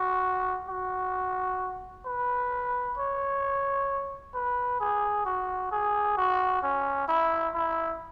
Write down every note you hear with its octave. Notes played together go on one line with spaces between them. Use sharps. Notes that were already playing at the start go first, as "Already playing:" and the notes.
Already playing: F#4
F#4
B4
C#5
B4
G#4
F#4
G#4
F#4
C#4
E4
E4